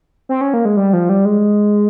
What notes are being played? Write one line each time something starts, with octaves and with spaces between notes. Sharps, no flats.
C4
C#4
A#3
G#3
G3
F3
G3
G#3